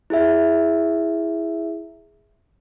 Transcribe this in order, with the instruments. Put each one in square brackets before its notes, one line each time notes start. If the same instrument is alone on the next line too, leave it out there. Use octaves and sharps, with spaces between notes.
[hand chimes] E4 G#4 E5